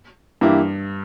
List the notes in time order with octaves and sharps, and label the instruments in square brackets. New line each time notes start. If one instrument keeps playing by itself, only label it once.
[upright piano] G2 [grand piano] E3 A#3 E4 G4